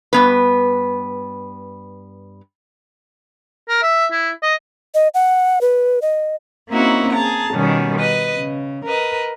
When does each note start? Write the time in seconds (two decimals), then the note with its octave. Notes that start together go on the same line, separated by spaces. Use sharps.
0.13 G2 B3 B4
3.69 A#4
3.83 E5
4.11 E4
4.43 D#5
4.94 D#5
5.14 F#5
5.61 B4
6.02 D#5
6.69 A#3 C4 C#4 D#4 E4 F#4
7.13 G#4 A5 A#5
7.53 B2 D#3 G3 C#4
7.99 B4 D#5
8.35 C#3
8.85 A#4 B4 D#5